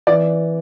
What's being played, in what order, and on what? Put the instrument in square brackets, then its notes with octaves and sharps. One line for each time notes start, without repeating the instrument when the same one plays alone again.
[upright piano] E3 D5